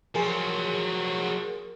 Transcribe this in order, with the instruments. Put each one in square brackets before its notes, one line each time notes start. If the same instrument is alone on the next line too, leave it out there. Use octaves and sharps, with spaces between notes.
[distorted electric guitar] F3 F#3 [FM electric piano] G#4 A#4